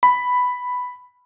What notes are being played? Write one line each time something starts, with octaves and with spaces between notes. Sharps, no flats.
B5